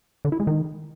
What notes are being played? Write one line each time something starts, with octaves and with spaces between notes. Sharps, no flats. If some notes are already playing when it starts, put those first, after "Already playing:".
D3
E4
G#3
D#3